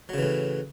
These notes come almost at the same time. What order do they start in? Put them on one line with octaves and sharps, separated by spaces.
F#3 C#3 E3 A2